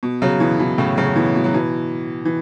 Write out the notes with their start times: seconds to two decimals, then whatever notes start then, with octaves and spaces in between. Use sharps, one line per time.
0.03 B2
0.22 C#3 F#3
0.40 B2 E3
0.59 B2 E3
0.78 A2 C#3
0.97 C#3 F#3
1.16 B2 E3
1.35 B2
1.44 F#3
1.54 B2 E3
2.25 E3